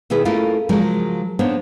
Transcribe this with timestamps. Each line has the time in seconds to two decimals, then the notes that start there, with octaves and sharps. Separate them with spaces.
0.10 B2 D#3 E4 G#4 B4
0.25 A3 A#3 C#4 E4 F4 A#4
0.69 C#3 F3 F#3 G#3 A#4
1.39 A#3 B3 D4 D#4 C5 C#5